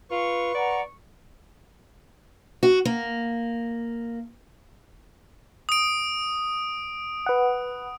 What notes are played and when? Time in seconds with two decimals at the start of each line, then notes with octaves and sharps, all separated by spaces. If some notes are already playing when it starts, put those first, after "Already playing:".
0.11 F4 B4 C#6
0.55 D5 F#5 A#5
2.63 F#4
2.85 A#3
5.69 D#6 D7
7.26 B4 F#5